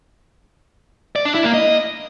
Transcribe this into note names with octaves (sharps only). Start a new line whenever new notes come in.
D5
D4
E4
A#3
D#5